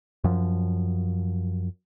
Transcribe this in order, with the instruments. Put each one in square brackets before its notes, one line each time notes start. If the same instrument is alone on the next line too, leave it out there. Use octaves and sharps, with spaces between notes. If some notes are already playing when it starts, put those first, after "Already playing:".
[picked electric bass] F#2 F3